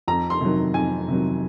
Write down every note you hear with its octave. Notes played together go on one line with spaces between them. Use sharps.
F2 A#5
C6
C3 D#3 F#3
F2 G#5
C3 D#3 F#3